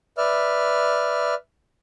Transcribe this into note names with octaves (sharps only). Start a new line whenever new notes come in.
B4 D5 E5 F6